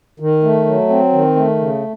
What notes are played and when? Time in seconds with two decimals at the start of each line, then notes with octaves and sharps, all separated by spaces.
0.20 D#3
0.43 A3
0.66 F#3
0.89 C4
1.13 D#3
1.35 A3
1.59 C#3